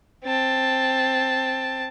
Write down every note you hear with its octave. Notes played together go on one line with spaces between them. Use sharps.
C4 A5